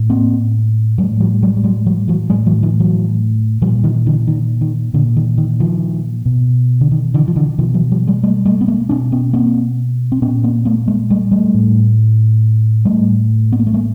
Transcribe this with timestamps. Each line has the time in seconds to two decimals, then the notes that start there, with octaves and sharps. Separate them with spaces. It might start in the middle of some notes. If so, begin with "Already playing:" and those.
Already playing: A2
0.10 A#3 C4
0.98 A2 F#3 G#3
1.20 F3 G3
1.43 F#3 G#3
1.57 G3
1.64 F#3 G#3
1.86 F3 G3
2.08 E3 F#3
2.30 A2 F#3 G#3
2.46 E3 F#3
2.63 D#3 F3
2.80 E3 F#3
3.62 A#2 F3 G3
3.84 D#3 F3
4.06 D3 E3
4.28 D#3
4.61 D#3
4.94 A#2 D3
5.17 D#3
5.38 D#3
5.60 D#3 F3
6.26 B2
6.81 D3
6.91 D#3
7.14 D3 E3
7.28 F3
7.36 D3 E3
7.58 B2 D#3 F3
7.74 E3 F#3
7.92 F3 G3
8.07 F#3 G#3
8.23 G3 A3
8.45 G3 A3
8.61 B3
8.68 G#3 A#3
8.89 B2 C4 D4
9.12 B3 C#4
9.33 A#3 C4
10.12 C4
10.22 A#2 B3 C#4
10.43 A#3 C4
10.65 A3 B3
10.88 G#3 A#3
11.10 G3 A3
11.31 G3 A3
11.54 A2
12.85 A2 G3 A3
13.52 B3
13.59 A#3
13.67 A3
13.74 G#3 A#3